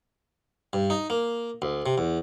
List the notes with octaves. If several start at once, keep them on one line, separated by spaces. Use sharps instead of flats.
G2
D#4
A#3
D2
C3
E2